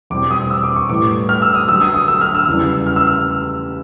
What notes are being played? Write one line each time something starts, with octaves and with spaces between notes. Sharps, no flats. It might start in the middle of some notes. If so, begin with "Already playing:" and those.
E2 B2 G3 C4 D6
D#6
E6
D6
C#6
A2 E3 G3 B3 D6
F6
E6
D#6
D3 F#3 B3 E6
D#6
D#6
E6
F6
E6
E2 C#3 E3 G3 B3
F6
E6
F6